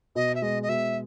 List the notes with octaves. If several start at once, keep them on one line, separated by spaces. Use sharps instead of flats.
B2 D#5
E5
G#3 D#5
D#5
B2 E5